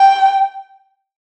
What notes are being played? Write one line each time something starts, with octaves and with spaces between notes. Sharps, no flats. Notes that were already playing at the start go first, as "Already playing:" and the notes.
Already playing: G5